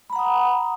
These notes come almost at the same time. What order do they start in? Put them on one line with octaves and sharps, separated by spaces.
B5 A#5 F#5 D#6